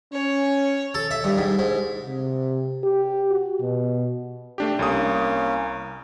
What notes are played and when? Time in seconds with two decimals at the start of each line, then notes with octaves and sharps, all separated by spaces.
0.13 C#4 C#5
0.94 A4
1.11 E5
1.24 G2
1.38 G#2
1.59 G#2
2.06 C3
2.84 G4
3.31 F#4
3.60 B2
4.58 A3 D4 G4
4.79 C2 A#3 C#4 D#6